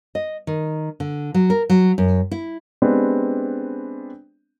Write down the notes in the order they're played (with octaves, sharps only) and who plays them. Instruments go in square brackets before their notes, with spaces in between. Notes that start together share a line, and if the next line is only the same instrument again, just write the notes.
[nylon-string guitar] D#5
D#3
D3
F#3
A#4
F#3
F#2
E4
[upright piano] G#3 B3 C4 D4 G4